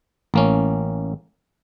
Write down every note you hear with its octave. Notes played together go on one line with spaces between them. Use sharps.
A1 A#3 C#4